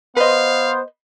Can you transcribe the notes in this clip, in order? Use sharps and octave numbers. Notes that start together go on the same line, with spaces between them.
B3 B4 C5 D#5 F5